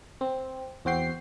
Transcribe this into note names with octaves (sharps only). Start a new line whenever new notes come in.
C4
E2 C4 F#4 G5 C7